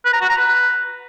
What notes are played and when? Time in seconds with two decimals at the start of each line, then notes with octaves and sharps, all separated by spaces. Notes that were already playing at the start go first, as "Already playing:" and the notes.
0.05 B4
0.13 A#5
0.21 F#4
0.29 A#5
0.37 B4